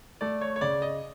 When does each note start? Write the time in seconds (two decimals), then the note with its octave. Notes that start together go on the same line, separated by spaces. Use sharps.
0.21 A3 D5
0.41 C#5
0.56 C#5
0.61 C#3 D5
0.82 D#5